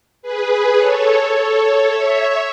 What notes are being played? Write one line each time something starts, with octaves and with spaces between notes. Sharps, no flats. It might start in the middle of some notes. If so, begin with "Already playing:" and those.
G#4 B4
A4 C#5
A4 C#5
C#5 E5